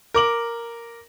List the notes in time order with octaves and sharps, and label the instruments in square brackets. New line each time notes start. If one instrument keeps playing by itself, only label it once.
[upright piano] A#4 D6 F#7